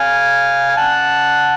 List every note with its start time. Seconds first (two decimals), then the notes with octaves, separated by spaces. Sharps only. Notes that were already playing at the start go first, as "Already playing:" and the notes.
Already playing: F5 G#5
0.77 F#5 A5